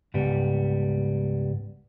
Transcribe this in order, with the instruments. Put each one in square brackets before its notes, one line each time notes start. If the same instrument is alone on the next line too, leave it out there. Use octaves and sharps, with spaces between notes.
[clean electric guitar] C#2 G#2 G3 B3